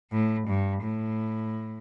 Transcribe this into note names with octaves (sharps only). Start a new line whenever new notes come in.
A2
G2
A2